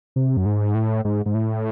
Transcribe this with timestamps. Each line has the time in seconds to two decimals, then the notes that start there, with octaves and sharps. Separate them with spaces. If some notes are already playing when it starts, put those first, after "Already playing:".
0.16 C3
0.37 F#2
0.46 G#2
0.75 A2
1.05 G#2
1.26 G#2
1.34 A2